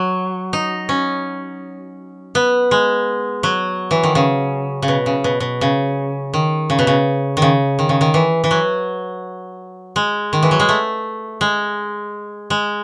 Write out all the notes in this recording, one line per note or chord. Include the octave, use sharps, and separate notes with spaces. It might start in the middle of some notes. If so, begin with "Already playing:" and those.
Already playing: F#3
D#4
C#4
B3
G#3
F#3
E3
D#3
C#3
C#3
B2
C#3
B2
B2
C#3
D#3
C#3
B2
C#3
D#3
C#3
D#3
C#3
D#3
E3
E3
F#3
G#3
D#3
E3
F#3
G#3
A3
G#3
G#3